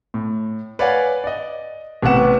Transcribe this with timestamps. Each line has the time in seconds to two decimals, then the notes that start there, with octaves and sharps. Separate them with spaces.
0.14 A2
0.79 B4 C#5 D5 F5 F#5 G#5
1.24 D5 D#5
2.02 A1 C3 B3 B4 F#5 E7